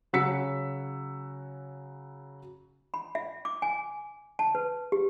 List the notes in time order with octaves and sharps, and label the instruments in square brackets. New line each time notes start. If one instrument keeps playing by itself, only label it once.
[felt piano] C#3 F#3 F#5 E6 B6 C#7
[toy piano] B5
E5
D6
G#5
A5
B4
G4